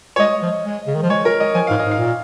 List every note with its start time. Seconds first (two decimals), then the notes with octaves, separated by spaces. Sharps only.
0.16 C#5
0.20 G#3 D#5
0.42 F3
0.65 G#3
0.87 C#3
0.95 D#3
1.02 F3
1.10 G#3 C#5
1.25 A#4
1.40 D#5
1.55 F3 G#5
1.67 G#2 F5
1.79 D#5
1.85 G#2
1.91 F5
1.98 A#2